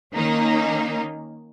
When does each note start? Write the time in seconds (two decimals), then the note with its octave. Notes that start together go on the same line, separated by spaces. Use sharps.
0.14 D#3 A#3 C#4 D#4